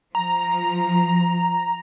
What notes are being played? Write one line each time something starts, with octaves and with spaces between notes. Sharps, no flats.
F3 A#5